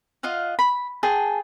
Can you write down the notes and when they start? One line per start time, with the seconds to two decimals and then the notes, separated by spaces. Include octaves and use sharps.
0.23 F4 D#5 F5 F#5
0.59 B5
1.03 G#4 G5 A5 C6